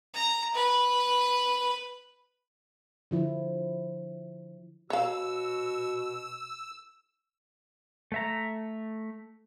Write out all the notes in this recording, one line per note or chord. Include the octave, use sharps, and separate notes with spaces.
A#5
B4
D3 F3 E4
B2 F#4 C#5 F5 E6
A3 E5 A#5